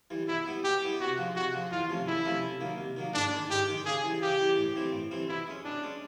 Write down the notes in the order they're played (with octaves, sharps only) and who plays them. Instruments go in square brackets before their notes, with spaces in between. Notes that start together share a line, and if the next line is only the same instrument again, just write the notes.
[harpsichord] E3 G3
[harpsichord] B2 [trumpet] E4
[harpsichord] G3 B3 E4
[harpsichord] B2 [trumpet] G4
[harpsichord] G3 B3 E4
[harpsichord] C3 [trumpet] F#4
[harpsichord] F3 G#3
[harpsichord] C3 [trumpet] F#4
[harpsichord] F3 G#3
[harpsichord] E2 [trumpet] F4
[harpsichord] C3 F3 A3 C#4
[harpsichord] E2 [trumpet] E4
[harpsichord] C3 F3 A3 C#4
C3
D#3 F#3 A#3
C3
D#3 F#3 A#3
[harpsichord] G#2 [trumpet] D4
[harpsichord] D#3 G#3
[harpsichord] G#2 [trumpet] G4
[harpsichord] D#3 G#3
[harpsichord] C#3 [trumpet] G#4
[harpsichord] E3 G3
[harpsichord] C#3 [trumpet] G4
[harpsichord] E3 G3
A2
E3 G3 C4 E4
A2
E3 G3 C4 E4
[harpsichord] B2 [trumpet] E4
[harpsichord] G#3 C#4
[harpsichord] B2 [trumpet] D4
[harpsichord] G#3 C#4